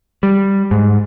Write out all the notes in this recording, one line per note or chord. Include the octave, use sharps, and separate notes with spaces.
G3
G#2